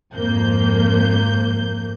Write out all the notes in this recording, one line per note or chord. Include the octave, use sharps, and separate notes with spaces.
G#1 F2 A#3 G6